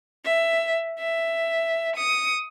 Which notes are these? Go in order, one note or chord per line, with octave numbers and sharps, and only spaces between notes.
E5
E5
D#6 C#7